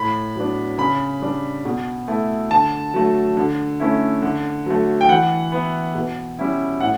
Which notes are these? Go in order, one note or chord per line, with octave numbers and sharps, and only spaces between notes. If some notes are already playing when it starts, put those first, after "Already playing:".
Already playing: A2 B5
F#3 B3 D4
C#3 B5
G3 D4
B2
A3 E4
D3 A5
F#3 A3
D3
A3 C#4 E4
D3
F#3 A3
G5
E3 F#5
B3 E4
B2
G3 C#4 E4
A2 F#5